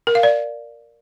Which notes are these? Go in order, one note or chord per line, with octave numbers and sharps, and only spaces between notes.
A#4
F5
D5